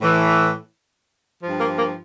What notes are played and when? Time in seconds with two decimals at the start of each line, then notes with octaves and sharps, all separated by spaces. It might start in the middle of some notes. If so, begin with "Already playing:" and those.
0.01 A2 E3
1.43 G2 F3
1.60 A#3 A#4
1.79 A#3 A#4